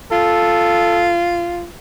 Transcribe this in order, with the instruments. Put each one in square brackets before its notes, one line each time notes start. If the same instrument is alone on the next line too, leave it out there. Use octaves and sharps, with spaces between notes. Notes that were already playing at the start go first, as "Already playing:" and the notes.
[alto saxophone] F4 [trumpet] A4